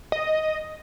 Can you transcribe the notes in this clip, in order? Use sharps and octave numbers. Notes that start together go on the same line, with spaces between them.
D#5